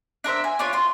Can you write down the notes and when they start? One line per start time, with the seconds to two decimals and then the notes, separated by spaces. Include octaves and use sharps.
0.24 D4 A#4 C5 E5
0.44 G#5
0.59 D4 F4 C#5
0.73 F4 C6